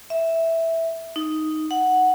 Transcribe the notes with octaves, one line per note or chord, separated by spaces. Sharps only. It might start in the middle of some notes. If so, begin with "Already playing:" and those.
E5
D#4
F#5